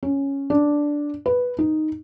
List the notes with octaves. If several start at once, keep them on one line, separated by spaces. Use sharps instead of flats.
C#4
D4
B4
D#4